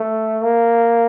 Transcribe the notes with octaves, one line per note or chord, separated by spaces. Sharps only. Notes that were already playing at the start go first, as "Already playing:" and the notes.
Already playing: A3
A#3